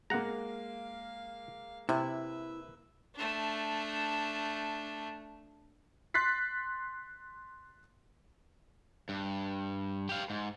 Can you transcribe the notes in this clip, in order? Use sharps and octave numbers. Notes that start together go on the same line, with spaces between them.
G#3 A#3 F5 F#5 A#5
C3 E4 B4 E5
A3 D4
C6 F#6 A6 B6 C7
G2
G4 F5
G#2